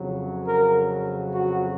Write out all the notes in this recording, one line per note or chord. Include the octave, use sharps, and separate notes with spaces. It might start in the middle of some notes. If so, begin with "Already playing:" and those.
Already playing: F2 C#3 F#3
A#4
F#4